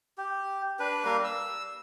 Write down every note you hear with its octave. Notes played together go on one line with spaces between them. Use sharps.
G4
D4 B4
G3 A#3 A#4 F5
E6